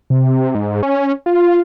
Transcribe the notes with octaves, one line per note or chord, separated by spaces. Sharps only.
C3
G#2
C#4
F4